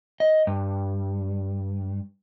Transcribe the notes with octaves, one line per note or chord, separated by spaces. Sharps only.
D#5
G2